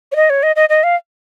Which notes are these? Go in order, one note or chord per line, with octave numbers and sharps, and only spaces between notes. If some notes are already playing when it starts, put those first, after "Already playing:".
C#5
D#5
C#5
D#5
D#5
D#5
F5